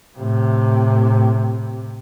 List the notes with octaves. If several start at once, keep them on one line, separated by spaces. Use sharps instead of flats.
A2 C3